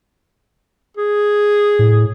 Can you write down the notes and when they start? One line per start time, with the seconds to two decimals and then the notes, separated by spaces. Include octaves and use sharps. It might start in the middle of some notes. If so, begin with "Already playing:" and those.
0.97 G#4
1.79 A2